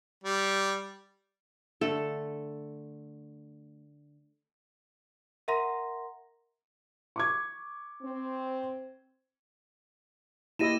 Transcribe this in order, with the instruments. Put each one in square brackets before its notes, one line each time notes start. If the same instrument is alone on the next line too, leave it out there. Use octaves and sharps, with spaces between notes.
[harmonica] G3
[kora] D3 A3 [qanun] A4
[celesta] A#4 E5 F#5 A#5 C6 A#6
[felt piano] C#6 D6 G#6
[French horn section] C4
[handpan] A#3 G4 [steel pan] E4 D#5 [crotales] A#6 D#7 E7